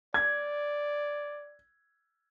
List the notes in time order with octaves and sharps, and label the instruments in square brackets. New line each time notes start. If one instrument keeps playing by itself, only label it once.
[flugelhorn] D5 [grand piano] G#6